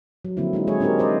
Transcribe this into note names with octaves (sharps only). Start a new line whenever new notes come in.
F#3
D3 F3 F#3 A#3 C4 E4
G#3 D#4 E4
F#3 G#3 G#4 C#5
C4 D4 D#4 G4 G#4 A#4
F4 A#4 C5 D5 D#5